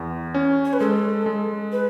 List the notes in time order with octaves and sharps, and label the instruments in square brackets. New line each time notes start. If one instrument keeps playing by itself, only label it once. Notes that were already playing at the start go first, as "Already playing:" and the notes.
Already playing: [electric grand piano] E2
C#4
[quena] C#5
B4
[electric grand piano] G#3 [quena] A4
[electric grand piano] G#3
[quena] B4